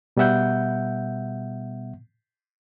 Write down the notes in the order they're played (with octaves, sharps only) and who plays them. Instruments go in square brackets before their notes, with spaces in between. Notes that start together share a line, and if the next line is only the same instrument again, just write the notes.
[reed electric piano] B2 G3 B3 E5 F#5 G6